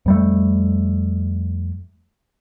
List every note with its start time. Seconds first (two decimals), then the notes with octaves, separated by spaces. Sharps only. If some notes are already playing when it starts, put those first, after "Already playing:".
0.06 F2 G3 A3